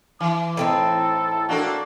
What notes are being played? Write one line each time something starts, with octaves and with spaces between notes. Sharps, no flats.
E3 D6
A2 C4 D#4 A4
A#3 D4 F#4 A4